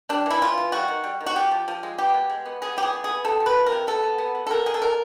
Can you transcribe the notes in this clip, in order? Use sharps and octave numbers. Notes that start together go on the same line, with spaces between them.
G3 D4
E3 E4
E3 F4
E3
G3 F#4
D#3
G3
D#3
F#4
F3 G4
F3
F3
G#3
B3 G4
B2
G#3
B3
B3 G#4
E3 G4
G#4
B3
G#4
B3
C3 A4
F3
B4
F3
A#4
C3
B3 A4
B3
B3
B3
A4
B2 A#4
B2 G#4
A4
B2 A#4